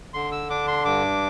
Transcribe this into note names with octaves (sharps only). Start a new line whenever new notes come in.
D3 C6
E6
D4 D6
C6
G2 D6